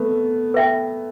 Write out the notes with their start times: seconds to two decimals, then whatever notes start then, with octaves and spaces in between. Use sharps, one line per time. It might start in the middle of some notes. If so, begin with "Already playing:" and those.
Already playing: A3 B3
0.54 B4 E5 G5